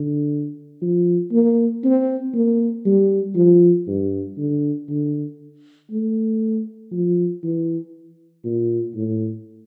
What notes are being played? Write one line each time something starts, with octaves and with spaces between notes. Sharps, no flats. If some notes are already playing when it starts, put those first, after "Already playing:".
Already playing: D3
F3
A#3
C4
A#3
G3
F3
G2
D3
D3
A3
F3
E3
A#2
A2